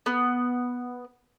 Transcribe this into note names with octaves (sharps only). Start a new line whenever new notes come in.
B3